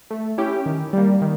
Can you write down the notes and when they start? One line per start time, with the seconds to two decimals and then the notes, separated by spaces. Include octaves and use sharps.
0.10 A3
0.38 C#4 E4 G4
0.66 D#3
0.93 G3 A#3
1.21 D#3